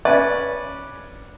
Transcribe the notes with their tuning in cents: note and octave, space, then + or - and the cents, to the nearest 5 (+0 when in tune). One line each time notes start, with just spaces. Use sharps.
C#4 +0 B4 -15 D5 +0